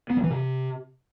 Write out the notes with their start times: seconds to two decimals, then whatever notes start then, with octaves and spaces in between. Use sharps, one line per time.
0.10 B3
0.17 F#3
0.24 E3
0.30 C3